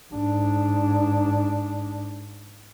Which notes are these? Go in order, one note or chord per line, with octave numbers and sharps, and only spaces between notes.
G#2 D4